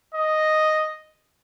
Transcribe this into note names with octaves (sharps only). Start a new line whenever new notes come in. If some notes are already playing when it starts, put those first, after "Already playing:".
D#5